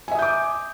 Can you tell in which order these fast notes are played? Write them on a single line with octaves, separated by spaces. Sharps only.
G#5 E5 D#6 G6 D6